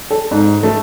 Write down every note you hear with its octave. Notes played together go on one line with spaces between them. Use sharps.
A4
G#2
A3